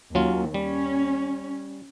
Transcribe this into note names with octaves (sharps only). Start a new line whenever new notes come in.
D#2 F#3 C#4 F4
G3 C#4